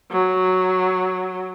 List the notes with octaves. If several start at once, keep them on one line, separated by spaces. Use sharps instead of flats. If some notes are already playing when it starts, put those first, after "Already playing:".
F#3